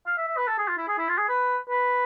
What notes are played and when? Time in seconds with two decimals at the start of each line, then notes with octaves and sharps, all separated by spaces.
0.07 F5
0.18 E5
0.28 E5
0.37 B4
0.47 A4
0.58 G#4
0.68 F4
0.77 E4
0.88 G#4
0.98 E4
1.09 F4
1.18 G#4
1.29 B4
1.69 B4